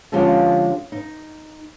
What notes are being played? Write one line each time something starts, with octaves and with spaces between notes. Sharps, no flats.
D3 F3 G#3 C#4 F4 G4
D#4